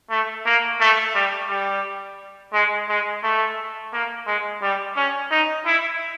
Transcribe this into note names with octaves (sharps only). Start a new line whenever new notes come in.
A3
A#3
A3
G3
G3
G#3
G#3
A3
A#3
G#3
G3
C#4
D#4
E4